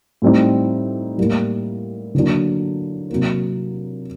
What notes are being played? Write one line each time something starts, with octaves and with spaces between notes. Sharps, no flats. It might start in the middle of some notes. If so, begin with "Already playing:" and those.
A2 G3 C4 D#4
A2 G3 A#3
D3 F#3 A#3 D4
C3 F#3 A#3